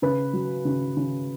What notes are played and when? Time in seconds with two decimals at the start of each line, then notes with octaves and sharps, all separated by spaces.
0.02 C#3 B4
0.33 F#3
0.65 C#3
0.97 C#3